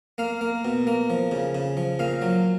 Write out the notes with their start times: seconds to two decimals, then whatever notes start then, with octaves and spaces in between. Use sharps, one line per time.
0.18 A#3 F5
0.41 A#3
0.65 B2
0.87 A#3
1.10 F3
1.31 C#3
1.55 C#3
1.77 F3
1.99 A#2 F5
2.22 F#3